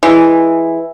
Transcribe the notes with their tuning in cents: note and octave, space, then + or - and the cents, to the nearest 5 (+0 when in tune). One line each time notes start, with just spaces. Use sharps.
E3 +0 G#3 +0